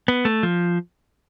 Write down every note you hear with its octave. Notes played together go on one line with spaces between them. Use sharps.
B3
A3
F3